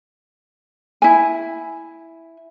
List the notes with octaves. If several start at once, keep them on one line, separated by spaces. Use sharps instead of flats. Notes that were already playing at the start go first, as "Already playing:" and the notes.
E4 G#5